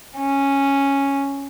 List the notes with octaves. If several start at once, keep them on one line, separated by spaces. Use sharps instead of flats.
C#4